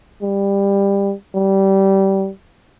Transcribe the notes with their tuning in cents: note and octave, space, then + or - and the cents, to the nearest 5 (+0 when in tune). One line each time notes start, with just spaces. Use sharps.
G3 +20
G3 -20